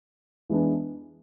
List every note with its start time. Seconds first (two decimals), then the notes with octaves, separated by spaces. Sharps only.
0.50 E3 G#3 B3 D4